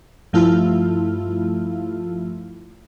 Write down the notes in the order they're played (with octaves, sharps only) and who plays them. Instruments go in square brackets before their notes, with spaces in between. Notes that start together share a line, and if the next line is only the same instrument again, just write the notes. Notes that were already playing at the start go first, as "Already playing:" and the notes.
[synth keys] G2 F3 A3 E4 F4